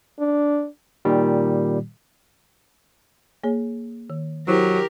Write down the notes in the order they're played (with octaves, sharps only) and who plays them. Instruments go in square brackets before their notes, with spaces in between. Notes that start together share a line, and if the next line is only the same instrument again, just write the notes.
[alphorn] D4
[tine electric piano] A#2 D#3 G3
[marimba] A#3 G#4 C#5
D#3
[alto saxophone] F#3 [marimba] E4 C5 [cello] G4 A#4